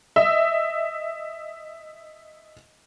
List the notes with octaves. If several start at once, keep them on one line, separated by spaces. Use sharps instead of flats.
D#5 E5